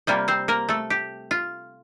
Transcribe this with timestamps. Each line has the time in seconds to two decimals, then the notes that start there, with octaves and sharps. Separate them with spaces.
0.07 C3 G3 A#3 F4
0.28 C4 C5
0.48 A#3 A#4
0.69 A3 A4
0.90 G4
1.31 F4